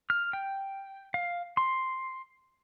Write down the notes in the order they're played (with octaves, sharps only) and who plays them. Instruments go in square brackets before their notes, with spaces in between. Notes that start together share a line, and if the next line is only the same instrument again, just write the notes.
[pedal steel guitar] F6
G5
F5
C6